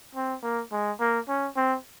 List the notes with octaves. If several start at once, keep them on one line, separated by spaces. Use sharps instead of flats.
C4
A#3
G#3
A#3
C#4
C4